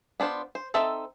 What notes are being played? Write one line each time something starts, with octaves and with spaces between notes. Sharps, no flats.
B3 D4 F4 C5
C5
C4 D#4 A4 E5 A5